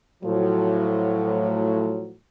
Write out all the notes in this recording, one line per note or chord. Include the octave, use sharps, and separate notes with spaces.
A2 F3 F#3